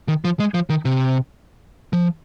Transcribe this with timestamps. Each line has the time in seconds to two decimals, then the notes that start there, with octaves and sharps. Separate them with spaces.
0.08 D#3
0.25 F3
0.40 G#3
0.54 F3
0.70 D#3
0.85 C3
1.93 F3